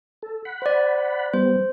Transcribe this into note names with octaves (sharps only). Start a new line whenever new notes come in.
A4
F#5 B5
C5 D5
G3 B3 C5